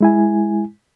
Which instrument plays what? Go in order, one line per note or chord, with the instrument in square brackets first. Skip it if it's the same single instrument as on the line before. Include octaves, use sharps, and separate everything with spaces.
[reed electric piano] G#3 E4 G#5